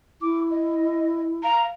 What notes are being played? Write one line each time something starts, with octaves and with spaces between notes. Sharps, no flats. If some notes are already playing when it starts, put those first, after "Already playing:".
E4 D6
D#5
F5 A#5